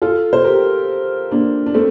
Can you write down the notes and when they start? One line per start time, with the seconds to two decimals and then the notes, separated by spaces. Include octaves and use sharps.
0.02 F4 A4
0.33 C5
0.44 G4 A#4
1.31 A#3 D4
1.66 D4
1.74 A3 C4